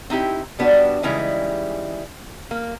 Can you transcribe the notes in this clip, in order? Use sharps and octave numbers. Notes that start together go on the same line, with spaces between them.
C4 D#4 E4 G4
G3 B3 D4 F#4
C#3 E3 G3 G#3 D#4 E4
A#3